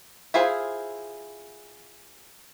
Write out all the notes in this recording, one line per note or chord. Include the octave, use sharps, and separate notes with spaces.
E4 F4 G#4 C5